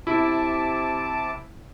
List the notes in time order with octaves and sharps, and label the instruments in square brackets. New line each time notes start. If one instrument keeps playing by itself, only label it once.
[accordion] C3 A5 D6 [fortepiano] E4